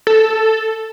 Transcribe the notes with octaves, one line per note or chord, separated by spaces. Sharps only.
A4